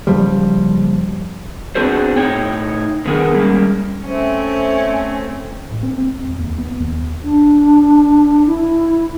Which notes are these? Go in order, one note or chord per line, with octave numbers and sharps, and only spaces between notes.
F#1 F3 G3
B3 C4 D4 F#4 G#4 C5
A2 D#4 C#5 G5
D3 D#3 B3 G#4 A#4
G3 G#3 A#3 C#4
A3 C4 C#4
A1
C4
C4
E1
D#2
B3
D#2
D4
E4